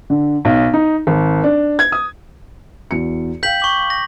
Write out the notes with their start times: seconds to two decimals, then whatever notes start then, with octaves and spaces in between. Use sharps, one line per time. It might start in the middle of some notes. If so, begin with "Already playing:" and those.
0.10 D3
0.45 B1
0.73 D#4
1.07 G#1
1.44 D4
1.79 G#6
1.92 D#6
2.91 E2 F#4 C#7
3.43 F5 G5 G6 B6 F#7
3.60 C#6 D6 F#7
3.90 A#6